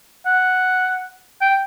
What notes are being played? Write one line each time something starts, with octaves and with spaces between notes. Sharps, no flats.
F#5
G5